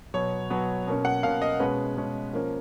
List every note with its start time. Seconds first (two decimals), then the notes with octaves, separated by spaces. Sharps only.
0.14 B2 F#3 B3 C#5
0.50 B2 F#3 B3
0.87 B2 A#3 C#4
1.05 F#5
1.23 B2 A#3 C#4 F5
1.42 D#5
1.60 B2 G#3 C#4 B4
1.97 B2 G#3 C#4
2.33 F3 A#3 C#4